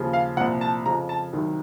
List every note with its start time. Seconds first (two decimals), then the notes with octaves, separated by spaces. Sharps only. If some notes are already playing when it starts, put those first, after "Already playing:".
Already playing: D#2 C#3 F3
0.13 F5
0.37 C2 A#2 F3 F#5
0.61 A5
0.85 F2 C#3 F3 A#5
1.09 A5
1.32 C2 C3 D#3 F#3